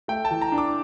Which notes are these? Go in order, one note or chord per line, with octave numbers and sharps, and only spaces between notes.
A3 G5
A5
E3
A#5
D4
D6